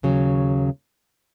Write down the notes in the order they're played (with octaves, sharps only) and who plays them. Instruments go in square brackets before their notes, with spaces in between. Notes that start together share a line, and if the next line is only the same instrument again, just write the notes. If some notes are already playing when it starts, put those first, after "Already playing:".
[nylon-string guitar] D#2 C#3 F#3